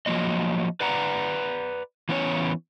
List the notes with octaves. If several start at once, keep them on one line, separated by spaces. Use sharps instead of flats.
F3 F#3 A#3 D#5
B4 D5 F#5 A#5
E3 B3 C#4 C#5